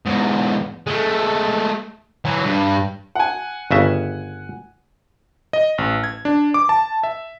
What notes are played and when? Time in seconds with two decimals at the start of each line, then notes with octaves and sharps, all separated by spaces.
0.06 E2 G#2
0.87 G#3 A3
2.25 E3 F#3
2.45 G2
3.15 F#5 G#5
3.71 G1 C#3 E5
5.53 D#5
5.78 A1
6.04 G#6
6.25 D4
6.54 D6
6.69 A5
7.03 E5